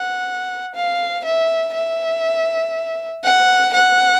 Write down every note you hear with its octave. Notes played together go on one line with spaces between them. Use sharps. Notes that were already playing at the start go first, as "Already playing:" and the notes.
Already playing: F#5
F5
E5
E5
F#5
F#5